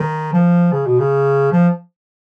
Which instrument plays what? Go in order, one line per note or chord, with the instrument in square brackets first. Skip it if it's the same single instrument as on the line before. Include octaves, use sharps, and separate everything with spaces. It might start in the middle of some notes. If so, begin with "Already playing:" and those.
Already playing: [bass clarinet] D#3
F3
C#3
B2
C#3
F3